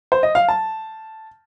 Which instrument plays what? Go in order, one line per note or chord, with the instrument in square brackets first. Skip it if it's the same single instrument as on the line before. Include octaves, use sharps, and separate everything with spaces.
[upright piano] C5
D#5
F5
A5